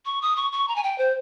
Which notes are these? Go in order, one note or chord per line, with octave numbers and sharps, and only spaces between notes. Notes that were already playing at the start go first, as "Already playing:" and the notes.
C#6
D#6
C#6
C#6
A#5
G#5
G5
C5